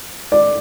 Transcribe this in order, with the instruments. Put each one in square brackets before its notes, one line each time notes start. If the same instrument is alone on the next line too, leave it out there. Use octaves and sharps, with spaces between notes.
[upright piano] D5